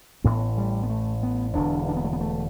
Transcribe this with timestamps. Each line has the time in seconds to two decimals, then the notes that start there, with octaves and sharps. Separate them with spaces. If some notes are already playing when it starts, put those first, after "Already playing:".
0.24 A1 A2 B3
0.58 G3
0.83 B3
0.90 A3
1.23 B3
1.55 E1 E2 D3 D4
1.89 D4
1.96 B3
2.04 A3
2.13 B3
2.21 A3